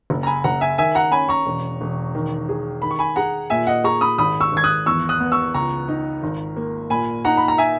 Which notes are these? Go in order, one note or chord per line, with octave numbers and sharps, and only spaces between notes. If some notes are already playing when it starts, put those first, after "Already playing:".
F#1
A#5
G#5 B5
F#1 F#5 A#5
E5 G#5
D#3 E5 G#5
F#5 A#5
C#4 G#5 B5
A#5 C#6
E1
E1
D#3
G#4
D#3 B5
C#6
G#5 B5
G#4 F#5 A#5
A#2 E5 G#5
D#5 F#5
G#4 A#5 C#6
B5 D#6
G#1 B5 D#6
C#6 E6
G#1 G#6
D#6 F#6
E2 C#6 E6
D#6 F#6
B3
C#6 E6
C#2 A#5 C#6
D#4
G#1
A#3
A#2 G#5 B5
D#4 F#5 A#5
B5
A#5
E5 G#5